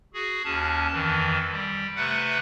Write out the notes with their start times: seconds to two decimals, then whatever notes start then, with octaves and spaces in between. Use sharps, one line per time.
0.14 F#4 G#4
0.44 D#2 C#4 A5
0.91 F2 D#3 E3
1.51 G3
1.96 C3 A3 B4 F#5